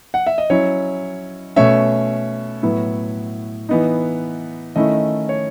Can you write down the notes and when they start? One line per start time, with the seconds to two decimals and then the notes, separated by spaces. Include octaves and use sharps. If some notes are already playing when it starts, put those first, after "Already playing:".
0.14 F#5
0.27 E5
0.38 D#5
0.50 F#3 C#4 E4 C#5
1.56 B2 A3 C#4 C#5 E5
2.63 A2 F#3 B3 E4
3.69 E3 B3 D#4
4.76 D#3 A3 C#4 E4 D#5
5.29 C#5